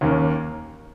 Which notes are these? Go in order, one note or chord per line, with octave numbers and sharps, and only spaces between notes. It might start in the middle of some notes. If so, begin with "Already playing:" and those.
D#2 D#3 A#3 C#4